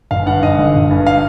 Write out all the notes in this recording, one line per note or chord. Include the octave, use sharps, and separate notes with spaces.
G1 F5
G2 F#5
G1 D#5
D3
G1
G2
F5